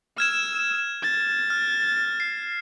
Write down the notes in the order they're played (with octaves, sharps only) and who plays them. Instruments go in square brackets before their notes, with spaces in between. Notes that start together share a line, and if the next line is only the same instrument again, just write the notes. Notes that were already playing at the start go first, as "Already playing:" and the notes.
[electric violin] E6 [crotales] F6 G#6 E7
[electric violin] A6
[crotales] F6
C7